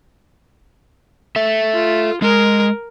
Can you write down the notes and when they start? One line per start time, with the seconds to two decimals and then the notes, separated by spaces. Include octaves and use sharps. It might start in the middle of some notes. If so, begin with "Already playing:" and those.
1.36 A4 E5
1.74 F4
2.22 G#3 A#4